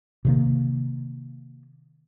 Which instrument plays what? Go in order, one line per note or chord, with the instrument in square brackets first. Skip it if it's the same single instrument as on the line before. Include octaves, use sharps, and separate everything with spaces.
[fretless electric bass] C3 D#3 A#3